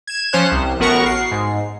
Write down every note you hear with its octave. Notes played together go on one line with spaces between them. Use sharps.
G#6 E7
F3 C#4 C5 C#5 F#6
C2
A1 B3 F#4 A#4 F#5 C#6
C7
G#2